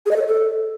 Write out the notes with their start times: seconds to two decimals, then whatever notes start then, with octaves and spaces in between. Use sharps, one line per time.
0.06 G#4
0.11 D#5
0.16 A4
0.21 C#5
0.26 A4